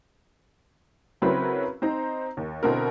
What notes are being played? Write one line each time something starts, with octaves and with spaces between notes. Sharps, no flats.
C#3 F#3 C4 E4 A#4 B4
C4 D#4 C5 A#5
D#2
B2 D3 C4 E4 A#4